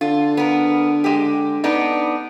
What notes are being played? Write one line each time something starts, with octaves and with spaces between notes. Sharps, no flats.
D3 F4
B3 A#4
G#3 G4
B3 D4 D#4